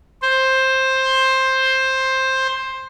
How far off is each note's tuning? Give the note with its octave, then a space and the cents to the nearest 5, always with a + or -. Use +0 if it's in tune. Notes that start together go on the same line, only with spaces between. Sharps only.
C5 +10